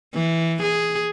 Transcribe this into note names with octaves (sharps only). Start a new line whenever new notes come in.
E3
G#4